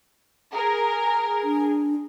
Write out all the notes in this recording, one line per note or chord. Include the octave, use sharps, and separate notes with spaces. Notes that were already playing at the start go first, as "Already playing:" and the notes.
G#4 A#4
D4